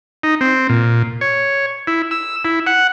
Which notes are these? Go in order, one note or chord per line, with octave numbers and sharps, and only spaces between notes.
D#4
C4
A#2
C#5
E4
E6
E4
F#5